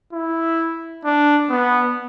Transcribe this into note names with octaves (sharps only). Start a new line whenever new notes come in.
E4
D4
B3